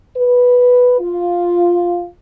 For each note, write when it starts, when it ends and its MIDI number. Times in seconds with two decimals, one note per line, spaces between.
0.17 0.94 71
1.01 2.08 65